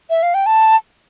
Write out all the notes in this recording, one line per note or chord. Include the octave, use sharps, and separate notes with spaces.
E5
F5
G5
A5